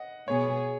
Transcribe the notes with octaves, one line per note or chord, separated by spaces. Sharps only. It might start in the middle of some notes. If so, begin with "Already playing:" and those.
Already playing: D#5 F#5
B2 B3 G#4 C#5